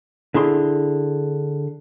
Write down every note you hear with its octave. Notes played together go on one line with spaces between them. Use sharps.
D3 E4 G#4 C6